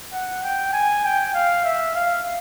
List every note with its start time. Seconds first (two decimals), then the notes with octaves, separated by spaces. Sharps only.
0.13 F#5
0.44 G5
0.74 G#5
1.05 G5
1.35 F5
1.65 E5
1.95 F5